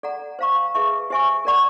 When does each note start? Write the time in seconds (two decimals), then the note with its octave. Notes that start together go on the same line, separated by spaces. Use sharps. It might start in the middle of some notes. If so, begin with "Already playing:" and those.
0.03 A4 D5 F#5 A#5
0.39 C5 F5 A#5 C#6
0.74 G#4 B4 E5 A5 C#6
1.10 G4 C5 E5 G#5 C#6
1.45 A#4 D5 F#5 A#5 C#6